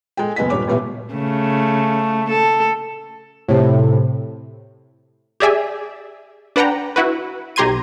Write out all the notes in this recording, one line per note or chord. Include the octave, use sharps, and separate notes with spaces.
G#3 A4 G5
F#1 B3 D#5 G#5 B6
D#1 G2 C#5 D6
A1 B2 B3 G4 E5
C#3 A3
A4
A2 C3
G4 G#4 D5 E5 G#5
D4 B4 F#5 G5 A#5
E4 F#4 B4
B1 G4 A#5 C6 G#6 D#7